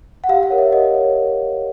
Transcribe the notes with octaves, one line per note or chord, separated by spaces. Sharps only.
F#5
G4 F5
F#5
A#4 C#5
E5
G4 D#5
A#4 C#5